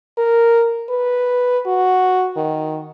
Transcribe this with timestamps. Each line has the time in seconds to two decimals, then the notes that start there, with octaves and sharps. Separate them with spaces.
0.18 A#4
0.90 B4
1.67 F#4
2.37 D#3